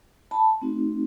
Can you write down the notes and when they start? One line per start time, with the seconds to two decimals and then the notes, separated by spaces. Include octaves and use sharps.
0.31 A5 B5
0.62 A3 C4 D#4 F#4